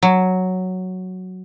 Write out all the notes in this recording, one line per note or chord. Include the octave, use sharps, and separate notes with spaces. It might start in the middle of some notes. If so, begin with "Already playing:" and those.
F#3